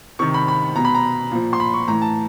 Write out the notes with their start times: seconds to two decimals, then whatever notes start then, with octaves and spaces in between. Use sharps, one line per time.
0.19 C3 D#3 C#6
0.34 B5
0.48 B5
0.76 B2 A#5
0.85 B5
0.95 A#5
1.31 A#2 F3
1.53 C6
1.60 B5
1.74 C#6
1.88 A2 E3 A#5
2.02 A5